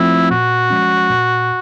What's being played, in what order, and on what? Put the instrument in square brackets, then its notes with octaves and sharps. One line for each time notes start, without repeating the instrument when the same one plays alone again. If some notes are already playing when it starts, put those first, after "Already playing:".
Already playing: [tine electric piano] F3 A3 C4 F4 [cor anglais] E4
[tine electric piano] A#2 [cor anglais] F#4
[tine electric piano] F3 G#3 C#4
A#2